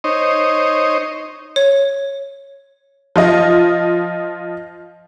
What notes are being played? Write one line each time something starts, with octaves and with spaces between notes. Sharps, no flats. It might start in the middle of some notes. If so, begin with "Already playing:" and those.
D#4 C5 C#5 D#5
C#5
F3 F4 D#5